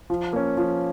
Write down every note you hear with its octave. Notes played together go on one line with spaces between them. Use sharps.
F3
A#3 C#4
F3